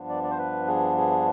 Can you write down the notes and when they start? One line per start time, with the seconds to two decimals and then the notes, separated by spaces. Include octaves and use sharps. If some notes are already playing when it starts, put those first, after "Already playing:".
Already playing: G2 F3 B3 D4
0.09 D5
0.23 D5
0.30 C5
0.38 B4
0.68 G#4
0.97 G#4